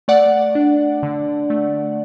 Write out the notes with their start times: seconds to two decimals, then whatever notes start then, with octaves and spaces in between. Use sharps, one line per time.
0.08 A3 D5 F#5
0.55 D4
1.03 D3
1.50 A3